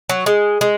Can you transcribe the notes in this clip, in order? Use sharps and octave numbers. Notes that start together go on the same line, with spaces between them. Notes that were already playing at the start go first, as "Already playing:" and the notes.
F#3
G#3
G#3